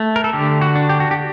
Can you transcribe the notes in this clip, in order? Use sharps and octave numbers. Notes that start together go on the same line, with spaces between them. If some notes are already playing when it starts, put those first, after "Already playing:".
Already playing: A3
A#4
A4
D3 G4
F#4
D4
G4
F#4
G4